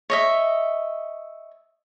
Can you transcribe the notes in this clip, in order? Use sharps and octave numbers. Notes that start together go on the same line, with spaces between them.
C#5 D#5 E5